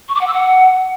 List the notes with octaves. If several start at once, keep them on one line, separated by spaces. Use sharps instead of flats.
C#6
D6
F#5
E6
F#5